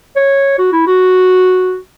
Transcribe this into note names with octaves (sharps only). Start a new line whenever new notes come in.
C#5
F#4
E4
F#4